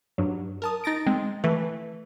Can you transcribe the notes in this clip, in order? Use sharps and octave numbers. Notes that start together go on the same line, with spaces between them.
G2 F#3
A#4 A5 D#6
D#4 A6 A#6 D7
G#3 C4
E3 A3 B4